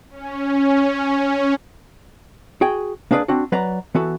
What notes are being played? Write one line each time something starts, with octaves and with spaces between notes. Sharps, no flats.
C#4
F#4 G#4 G5
A#3 D4 G#4 B4 D5
C4 D4 F#4
F#3 B4 D5 A#5
E3 B3 F#4 A4